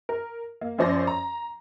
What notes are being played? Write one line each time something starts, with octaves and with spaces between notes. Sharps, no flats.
A#4
A#3
F#2 F3 C#4 C5 D5 A#6
A#5